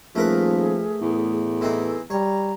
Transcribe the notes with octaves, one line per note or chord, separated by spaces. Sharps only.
D#1 F3 A3 G#4 A#4 B4
E2 A2
E3 C4 D#4 A4
G3 C#5 A#5